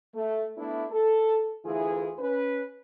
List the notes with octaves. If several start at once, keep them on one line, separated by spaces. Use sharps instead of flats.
A3
A3 B3 D4 E4
A4
D2 E3 E4 F4 G#4
C#4 B4